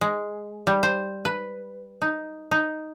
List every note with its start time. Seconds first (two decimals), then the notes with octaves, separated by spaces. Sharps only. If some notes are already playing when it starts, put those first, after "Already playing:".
0.01 G#3
0.67 G3
0.83 C5
1.25 B4
2.02 D#4
2.51 D#4